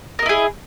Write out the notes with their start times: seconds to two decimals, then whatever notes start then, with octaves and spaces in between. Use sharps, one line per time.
0.19 A#4
0.22 D#5
0.26 E4
0.29 G#4